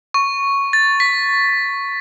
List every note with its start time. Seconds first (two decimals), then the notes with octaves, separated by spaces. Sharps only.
0.14 C#6
0.73 A6
1.00 B6